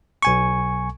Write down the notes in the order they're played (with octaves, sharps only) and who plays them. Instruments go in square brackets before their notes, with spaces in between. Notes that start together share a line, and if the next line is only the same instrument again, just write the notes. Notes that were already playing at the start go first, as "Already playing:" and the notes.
[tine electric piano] B1 G#5 C#6